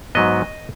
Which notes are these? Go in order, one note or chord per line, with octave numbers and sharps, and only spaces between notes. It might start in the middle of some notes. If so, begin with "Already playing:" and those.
G#2 F#3 B3 D#5